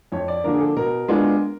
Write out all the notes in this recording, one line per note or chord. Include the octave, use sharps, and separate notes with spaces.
F2 C#5
D5
D3 F3 A#3 D4 A#4
G#4
A4
B2 A#4
G#3 B3 D4 F4